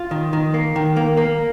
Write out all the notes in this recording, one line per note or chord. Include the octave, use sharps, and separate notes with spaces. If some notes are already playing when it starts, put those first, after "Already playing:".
Already playing: F4
D#3
D#3
A#3
D#3
A#3
A#3